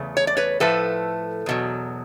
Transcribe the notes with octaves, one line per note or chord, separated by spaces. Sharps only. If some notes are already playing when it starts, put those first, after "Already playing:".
Already playing: E2 C#3 A3
C#5
D5
B4 C#5
A2 F3 A3 A4 B4
E2 B2 F#3